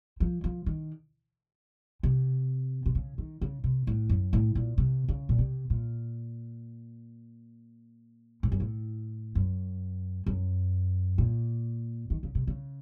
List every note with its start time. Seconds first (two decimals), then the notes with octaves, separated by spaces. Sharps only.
0.20 F3
0.44 F3
0.66 D#3
2.03 C3
2.86 C3
2.95 C#3
3.18 D#3
3.41 C#3
3.64 C3
3.87 A2
4.09 F#2
4.33 A2
4.55 A#2
4.78 C3
5.08 C#3
5.29 A#2
5.39 C3
5.70 A#2
8.43 A2
8.52 F#2
8.60 A2
9.35 F#2
10.26 F#2
11.18 A#2
12.10 D#3
12.23 C#3
12.35 C3
12.47 C#3